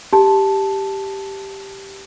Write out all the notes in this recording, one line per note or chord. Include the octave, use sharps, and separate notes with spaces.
G4 A5